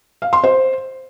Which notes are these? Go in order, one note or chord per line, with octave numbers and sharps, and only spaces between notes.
F5
C6
C5